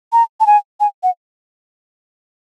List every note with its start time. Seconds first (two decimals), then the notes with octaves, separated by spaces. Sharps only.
0.13 A#5
0.40 A5
0.47 G#5
0.80 G#5
1.03 F#5